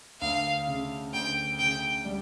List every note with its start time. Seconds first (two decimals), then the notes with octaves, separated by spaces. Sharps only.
0.21 D2 F5
0.67 C#3
1.13 D2 G5
1.59 C#3 G5
2.05 G3